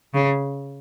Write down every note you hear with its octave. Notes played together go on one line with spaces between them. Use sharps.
C#3